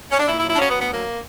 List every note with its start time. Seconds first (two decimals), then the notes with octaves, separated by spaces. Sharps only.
0.11 C#4
0.20 D4
0.28 A#2 E4
0.38 E4
0.43 F#3
0.49 E4
0.55 D4
0.59 F#3 C#4
0.70 B3
0.75 D2
0.81 B3
0.90 F#3 A#3